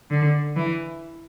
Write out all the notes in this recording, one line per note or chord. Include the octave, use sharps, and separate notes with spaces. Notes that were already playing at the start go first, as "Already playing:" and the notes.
D3
E3